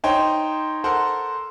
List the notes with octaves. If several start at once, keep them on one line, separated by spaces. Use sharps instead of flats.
D#4 C5 C#5 G5
A4 A#4 C5 F#5